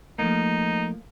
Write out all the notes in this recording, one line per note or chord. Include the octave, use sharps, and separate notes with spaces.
F3 A3 A#3 D#4